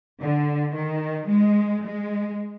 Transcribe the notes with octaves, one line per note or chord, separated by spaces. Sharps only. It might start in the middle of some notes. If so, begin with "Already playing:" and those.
D3
D#3
G#3
G#3